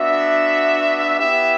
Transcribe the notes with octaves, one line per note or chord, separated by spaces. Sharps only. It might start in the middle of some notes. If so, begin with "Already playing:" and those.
Already playing: B3 D4 F#4 E5
B3 E4 G4 E5